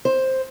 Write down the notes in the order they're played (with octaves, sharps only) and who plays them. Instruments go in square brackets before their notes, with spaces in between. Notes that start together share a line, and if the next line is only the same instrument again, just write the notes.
[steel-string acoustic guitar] C5